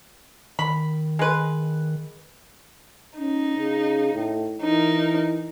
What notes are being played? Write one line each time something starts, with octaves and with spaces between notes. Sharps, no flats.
D#3 B5
G#3 B4
C#4 D#4
C#3
A2
E3 D#4 A#4